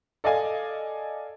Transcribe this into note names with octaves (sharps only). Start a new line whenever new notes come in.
A4 D5 D#5 F5 G#5